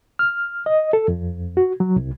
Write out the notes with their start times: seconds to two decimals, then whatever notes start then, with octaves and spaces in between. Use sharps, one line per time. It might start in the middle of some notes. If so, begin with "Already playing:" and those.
0.19 F6
0.66 D#5
0.93 A4
1.08 F2
1.57 F#4
1.80 F#3
1.96 C2